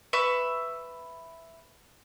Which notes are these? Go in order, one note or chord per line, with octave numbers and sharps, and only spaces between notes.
B4 E5 C#6